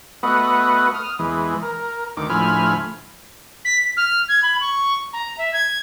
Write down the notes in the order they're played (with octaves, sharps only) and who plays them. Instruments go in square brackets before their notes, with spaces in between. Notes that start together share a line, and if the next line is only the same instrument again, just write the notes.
[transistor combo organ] A3 B3 F#4 B4 D#5 F#5
D#6 F6
E2 E3 G#3
A#4
D2 D#3 D6
D2 A2 F3 G#5 B5 F6
[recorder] B6
F6
G#6
B5
C#6
A#5
E5
G#6